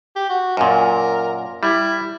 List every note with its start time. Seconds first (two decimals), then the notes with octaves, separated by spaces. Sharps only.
0.16 G4
0.29 F#4
0.57 F#2 A#2 A#4
1.63 G3 E4